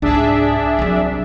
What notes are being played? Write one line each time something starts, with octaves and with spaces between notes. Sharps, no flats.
C2 G#2 D4 G#4 E5
C2 F#3